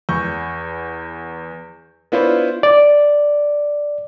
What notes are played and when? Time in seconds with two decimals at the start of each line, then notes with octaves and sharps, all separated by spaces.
0.09 E2 C#6 G6
2.12 B3 D4 E4 F4 C5 C#5
2.63 D5